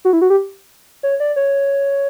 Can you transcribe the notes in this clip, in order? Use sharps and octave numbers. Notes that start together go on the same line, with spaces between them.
F#4
E4
F#4
G4
C#5
D5
C#5